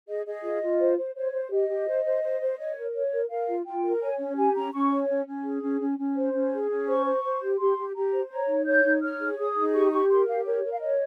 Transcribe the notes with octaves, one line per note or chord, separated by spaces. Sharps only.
G#4 D#5
G#4 D#5
F4
F4
C5
C5
C5 C#5
C5
G4 D#5
G4
C5
C5
C5
C5
C#5
A#4
C#5
A#4
A#4 F5
F4
F4 G5
A#4
C#5 G#5
C#4
G4 G#5
C#4 A#5
C#4 C#6
C#5
C#4
C#4
G#4
C#4
C#4
C#4
C5
C#4
G#4
C#4
C5 C#6
C5
C5
G4
G4 C6
G4
G4 A#5
C5
C#5 A#5
D#4
C#5 G6
D#4
C#5 F6
G#4
G#4 D#6
D#4
G4 C#6
G4 C#6
A#4 C6
G4 F5
A#4 C#5
A#4
F5
C#5 D#5